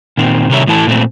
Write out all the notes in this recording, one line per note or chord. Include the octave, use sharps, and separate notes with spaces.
A#2 D#3 C4
C3 D#3 G3 A#4 C#5 E5
A2 E3 E4 A4 G5 A5
A#2 A3 C4